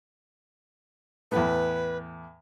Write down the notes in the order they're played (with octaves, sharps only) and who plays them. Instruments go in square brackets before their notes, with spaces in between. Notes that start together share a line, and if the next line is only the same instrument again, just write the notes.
[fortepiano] E2 A2 [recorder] B4